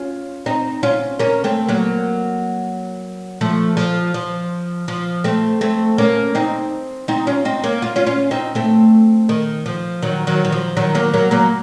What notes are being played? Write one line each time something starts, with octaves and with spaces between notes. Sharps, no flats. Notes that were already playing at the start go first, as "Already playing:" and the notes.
Already playing: C#4 F4
C4 D#4
C#4 F4
A#3 C#4
A3 C4
F#3 A#3
F3 A3
F3
F3
F3
A3 C4
A3 C4
A#3 C#4
C4 D#4
C4 D#4
C#4 F4
C4 D#4
A#3 C#4
F4
C#4 F4
C#4 F4
C4 D#4
A3 C4
D#3
F3
D#3 F#3
D#3 F#3
D#3
F3
D#3 F#3
F#3 A#3
F#3 A#3
F#3 A#3